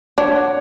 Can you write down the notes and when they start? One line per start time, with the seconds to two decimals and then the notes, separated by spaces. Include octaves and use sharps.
0.18 D4 C#5
0.35 F#5